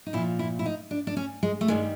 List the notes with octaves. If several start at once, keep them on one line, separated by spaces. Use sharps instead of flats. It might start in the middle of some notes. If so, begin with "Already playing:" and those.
D#4
A#2 F3 E4
E4
E4
D#4
D4
D4
C#4
G#3
A3
G2 D#3 G3 G#3